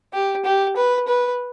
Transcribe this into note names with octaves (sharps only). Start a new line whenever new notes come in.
G4
G4
B4
B4